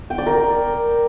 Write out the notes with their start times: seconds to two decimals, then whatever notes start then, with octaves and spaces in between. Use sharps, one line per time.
0.10 G5
0.18 D5
0.26 A#4